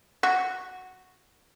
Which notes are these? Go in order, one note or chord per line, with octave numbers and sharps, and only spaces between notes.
F#4